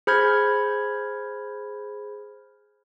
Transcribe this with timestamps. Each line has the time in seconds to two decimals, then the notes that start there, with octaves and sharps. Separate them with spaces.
0.07 G#4 C5 B5 F6 G6 G#6